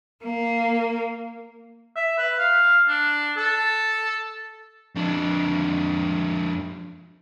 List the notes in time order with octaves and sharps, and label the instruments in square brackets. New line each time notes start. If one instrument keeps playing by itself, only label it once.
[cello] A#3
[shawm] E5
B4
F5
D4
A4
[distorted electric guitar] F2 D4